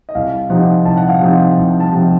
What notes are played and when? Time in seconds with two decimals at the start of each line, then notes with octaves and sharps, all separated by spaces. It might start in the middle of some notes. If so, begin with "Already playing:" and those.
0.09 D#5
0.15 C2 F5
0.50 C3 F3 C4 D#4 F#5
0.85 C2 A5
0.97 F#5
1.09 F5
1.19 C3 F3 C4 D#4 F#5
1.58 C2
1.80 A5
1.92 C3 F3 C4 D#4